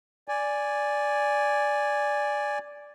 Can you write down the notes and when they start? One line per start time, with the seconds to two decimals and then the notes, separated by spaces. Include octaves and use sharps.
0.28 D5 G#5